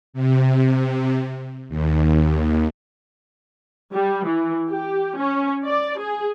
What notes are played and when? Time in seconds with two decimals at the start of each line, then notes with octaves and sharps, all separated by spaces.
0.14 C3
1.69 D#2
3.92 G3
4.27 E3
4.69 G4
5.17 C#4
5.65 D5
6.00 G#4